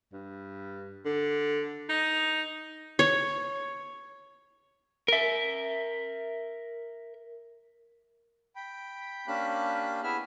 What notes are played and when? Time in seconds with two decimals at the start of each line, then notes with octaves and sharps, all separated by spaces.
0.13 G2
1.05 D3
1.89 D#4
2.99 C#5
5.08 A#4 E5
8.56 G5 B5
9.28 A#3 C#4 D4 G4 B5 F#6
10.03 B3 E4 G#4 E5 F6